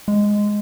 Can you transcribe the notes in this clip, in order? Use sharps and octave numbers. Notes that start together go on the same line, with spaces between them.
G#3